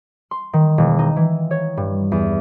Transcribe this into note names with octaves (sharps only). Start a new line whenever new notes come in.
C6
D#3
E1
D#4
E3
C#5
G2
E2